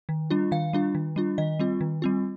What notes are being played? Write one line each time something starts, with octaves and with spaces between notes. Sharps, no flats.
D#3
G3 D4 F4
D#3 F5
G3 D4 F4
D#3
G3 D4 F4
D#3 D#5
G3 C4 F4
D#3
G3 C4 F4